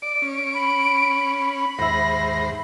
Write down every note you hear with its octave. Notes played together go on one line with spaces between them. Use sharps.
D5 D7
C#4
B5
D#2 G#2 C5 E5 F#5 A#6